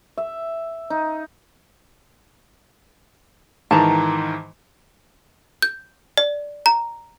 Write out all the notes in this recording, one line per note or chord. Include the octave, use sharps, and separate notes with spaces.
E5
D#4
G#2 D#3 E3 A5 A#5
G6
D5
A#5